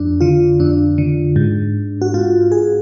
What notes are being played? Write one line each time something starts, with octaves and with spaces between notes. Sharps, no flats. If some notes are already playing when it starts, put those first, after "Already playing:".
Already playing: F2 D4
D3 F4
F2 D4
D3
G#2
F#4
G#2 F4
G#4